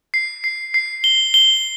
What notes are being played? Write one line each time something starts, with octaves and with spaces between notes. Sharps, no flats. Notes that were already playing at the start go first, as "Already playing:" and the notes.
C7
C7
C7
G7
G7